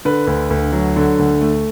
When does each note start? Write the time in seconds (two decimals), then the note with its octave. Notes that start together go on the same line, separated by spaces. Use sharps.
0.05 D3 B4
0.27 D2
0.50 D2
0.72 F#3
0.96 D3
1.19 D2
1.41 A3